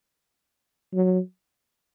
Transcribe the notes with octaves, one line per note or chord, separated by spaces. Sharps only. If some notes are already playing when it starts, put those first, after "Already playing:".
F#3